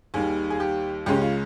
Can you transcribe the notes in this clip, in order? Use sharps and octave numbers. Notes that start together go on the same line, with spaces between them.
D#2 D#3 G3 G#4
G#4
G4
C#2 C#3 G#3 C#4 G4
F4